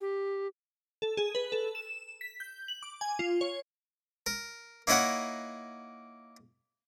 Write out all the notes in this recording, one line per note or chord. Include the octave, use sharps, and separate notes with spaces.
G4
A4
G#4
B4
A4
E7
B6
G6
F#7
D6
G#5
F4
C#5
A#4
A#3 D#4 E4 A#4 C#5 F#5